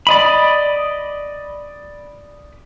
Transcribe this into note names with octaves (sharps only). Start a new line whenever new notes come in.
D5 D#5 B5